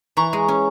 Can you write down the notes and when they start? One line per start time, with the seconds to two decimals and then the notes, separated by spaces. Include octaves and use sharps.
0.17 E3 A#5 C#6
0.33 G#3
0.48 C#4